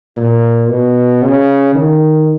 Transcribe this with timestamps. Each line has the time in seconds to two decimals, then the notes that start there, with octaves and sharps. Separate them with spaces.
0.17 A#2
0.69 B2
1.23 C#3
1.75 D#3